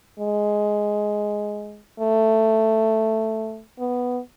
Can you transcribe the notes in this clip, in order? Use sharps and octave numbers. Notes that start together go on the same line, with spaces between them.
G#3
A3
B3